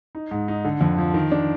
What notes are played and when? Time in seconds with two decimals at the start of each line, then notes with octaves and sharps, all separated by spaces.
0.15 D#4
0.31 G#2
0.48 D#4
0.65 D3
0.81 F2
0.98 F3
1.14 D#3
1.31 D4